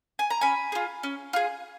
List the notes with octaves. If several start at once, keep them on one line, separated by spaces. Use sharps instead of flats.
G#5
A#5
C#4 G#5 B5
F4 G#4
C#4
F4 G#4